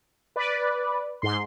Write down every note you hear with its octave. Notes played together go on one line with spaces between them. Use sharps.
B4 D5
G#2 C6